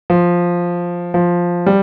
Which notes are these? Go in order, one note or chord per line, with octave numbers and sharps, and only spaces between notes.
F3
F3
G3